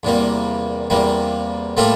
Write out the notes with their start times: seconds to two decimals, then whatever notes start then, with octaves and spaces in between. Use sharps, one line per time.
0.03 E2 C3 G3 A#3
0.90 E2 C3 G3 A#3
1.77 A2 G3 A#3 F4 A4